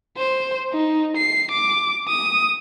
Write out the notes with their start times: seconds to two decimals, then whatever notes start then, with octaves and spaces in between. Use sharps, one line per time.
0.18 C5
0.72 D#4
1.17 C7
1.52 D6
2.09 D#6